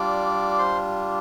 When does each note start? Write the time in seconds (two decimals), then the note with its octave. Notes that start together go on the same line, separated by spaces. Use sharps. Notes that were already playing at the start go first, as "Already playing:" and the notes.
Already playing: G3 D4 F4 D5 D6
0.59 C5 C6